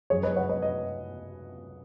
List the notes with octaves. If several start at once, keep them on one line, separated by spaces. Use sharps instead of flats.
F#2 F#3 G#4 C#5
B4 D#5
C#5 F#5
B4 D#5
B4 D#5